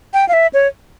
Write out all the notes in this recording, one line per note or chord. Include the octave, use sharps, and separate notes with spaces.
G5
F5
E5
C#5